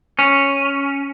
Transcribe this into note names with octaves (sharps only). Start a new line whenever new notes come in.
C#4